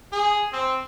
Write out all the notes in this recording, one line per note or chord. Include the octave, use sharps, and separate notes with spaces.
G#4
C4